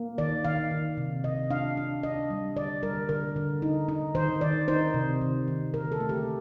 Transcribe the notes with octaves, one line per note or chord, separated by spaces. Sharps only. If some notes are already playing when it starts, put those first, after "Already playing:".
Already playing: A#3
D#3 D5
D#3 F5
D#3
C3
C3 D#5
D4 F5
D4
D4 D#5
G3
D3 D5
G3 A#4
D3 A#4
D3
D#4
D#4
D#3 C5
D#3 D5
D#4 C5
C3
D#3
D#3
D3 A#4
A4
A3
G4